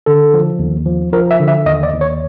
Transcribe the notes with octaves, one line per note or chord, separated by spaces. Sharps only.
D3 A4
F3
D#2
F3
F3 A#4
E5
D3
E5
D#2 D#5
D5
D#2
C#5